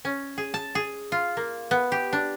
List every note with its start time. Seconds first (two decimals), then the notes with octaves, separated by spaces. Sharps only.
0.05 C#4
0.38 G#4
0.54 A5
0.75 G#4
1.12 F4
1.37 A#3
1.71 B3
1.92 G4
2.13 D4